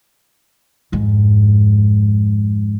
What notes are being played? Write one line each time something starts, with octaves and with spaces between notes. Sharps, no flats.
F2 G#2